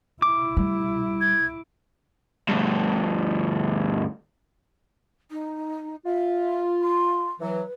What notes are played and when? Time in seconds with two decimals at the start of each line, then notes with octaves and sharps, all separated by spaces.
0.22 E4 D6
0.57 G3
1.21 G#6
2.48 D2 G2
5.31 D#4
6.05 F4 E5
6.81 C6
7.40 E3 F#3 B4